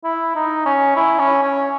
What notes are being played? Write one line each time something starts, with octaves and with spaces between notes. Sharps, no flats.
E4
D#4
C#4
E4
C#4
C#4